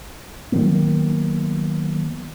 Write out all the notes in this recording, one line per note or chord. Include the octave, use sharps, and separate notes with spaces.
D#3 F#3 A#3 B3